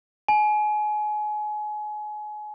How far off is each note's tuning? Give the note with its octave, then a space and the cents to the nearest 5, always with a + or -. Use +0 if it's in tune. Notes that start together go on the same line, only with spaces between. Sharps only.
G#5 +30